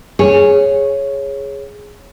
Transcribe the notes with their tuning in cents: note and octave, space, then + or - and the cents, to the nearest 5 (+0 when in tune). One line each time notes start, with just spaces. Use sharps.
G#4 +0 C#5 -5